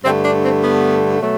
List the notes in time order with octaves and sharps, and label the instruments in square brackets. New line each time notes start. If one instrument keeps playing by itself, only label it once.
[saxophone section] G2 D3 A3 C4
D4
C4
B3
B2 F#3 A3